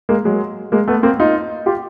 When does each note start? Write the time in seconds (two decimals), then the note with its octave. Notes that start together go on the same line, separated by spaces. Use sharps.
0.09 G#3 A#3
0.25 F#3 G#3
0.72 G#3 A#3
0.88 A3 B3
1.03 A#3 C4
1.20 D#4 F4
1.66 F4 G4